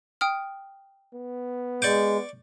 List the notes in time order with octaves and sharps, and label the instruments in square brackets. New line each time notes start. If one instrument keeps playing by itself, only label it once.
[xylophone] G5 D#6 F6
[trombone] B3
[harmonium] G#3 [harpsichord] D5 C#6 D6 [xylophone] G6